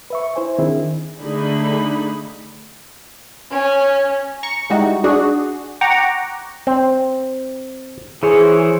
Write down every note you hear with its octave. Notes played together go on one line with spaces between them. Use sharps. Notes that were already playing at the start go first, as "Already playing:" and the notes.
B4 E5 C#6
E4 C5 G#5
D#3 C4 D4 E4 G#4
D3 A3 D#4 G#4 B5
C#4
A#5 C#6
G3 G#3 D#4 E4 F#4 G4
D4 F#4 G#4 D5
F#5 G5 A#5 C#6 D6
C4
E3 G#4 C5 C#5